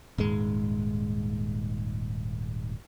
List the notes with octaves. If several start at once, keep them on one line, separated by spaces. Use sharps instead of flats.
D#1 G#2 G#3